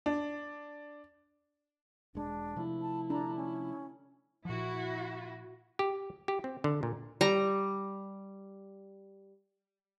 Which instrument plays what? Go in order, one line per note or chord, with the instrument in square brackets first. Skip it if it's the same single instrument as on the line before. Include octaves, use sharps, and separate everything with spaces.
[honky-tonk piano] D4
[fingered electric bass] E1 G#3 [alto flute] D4
[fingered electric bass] C3 F3 A3 [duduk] E4
[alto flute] A5
[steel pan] D4 [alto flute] A#5
[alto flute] C#4
[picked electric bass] A#2 F3 [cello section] E4 F#4
[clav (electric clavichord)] G4
G4
C4
D3
A#2
[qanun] G3 A#5